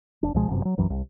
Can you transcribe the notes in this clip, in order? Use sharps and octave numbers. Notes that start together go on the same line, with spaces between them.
F1 D4
C#2 B2 F3 G#3
G1 F#2 C3
F#3
B1 F#2 E3 F#3
C2